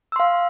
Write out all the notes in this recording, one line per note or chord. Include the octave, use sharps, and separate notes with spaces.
F5 C6 E6